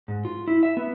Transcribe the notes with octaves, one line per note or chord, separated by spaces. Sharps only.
G#2
F4
E4
E5
B3